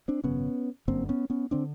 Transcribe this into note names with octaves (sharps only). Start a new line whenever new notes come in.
C4 D4
G#1 F#2 C#3 B3 C#4
G1 F#2 D3 A#3 C4
B3 C#4
B3 C#4
D3 C4 D4